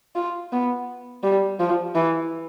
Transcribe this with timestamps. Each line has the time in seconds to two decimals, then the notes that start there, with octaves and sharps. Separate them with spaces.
0.15 F4
0.52 B3
1.23 G3
1.60 F3
1.95 E3